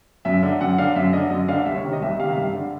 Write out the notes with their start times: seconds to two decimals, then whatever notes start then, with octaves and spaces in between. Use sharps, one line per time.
0.25 F#2 E5
0.43 D3
0.61 F#2 F#5
0.78 D3 F5
0.96 F#2 E5
1.13 D3 D#5
1.30 F#2 D#5
1.49 D3 F5
1.66 C2 E5
1.75 C#5
1.84 C3 D#3
1.93 D#5
2.02 C2 E5
2.19 C3 F5
2.24 D#3 E5
2.36 G2 F5
2.55 D3